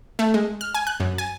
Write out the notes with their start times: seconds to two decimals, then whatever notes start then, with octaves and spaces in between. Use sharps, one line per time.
0.19 A3
0.34 G#3
0.61 F6
0.74 G#5
0.87 F#6
1.00 F#2
1.18 G#5